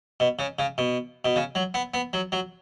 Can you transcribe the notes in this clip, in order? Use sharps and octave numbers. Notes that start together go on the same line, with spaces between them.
B2
C#3
C#3
B2
B2
C#3
F#3
B3
B3
F#3
F#3